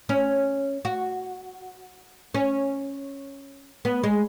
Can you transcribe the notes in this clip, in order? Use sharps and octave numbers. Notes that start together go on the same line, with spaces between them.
C#4
F#4
C#4
B3
G#3